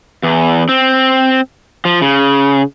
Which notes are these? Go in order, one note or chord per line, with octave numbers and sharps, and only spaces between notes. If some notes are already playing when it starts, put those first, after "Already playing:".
E2
C4
F3
C#3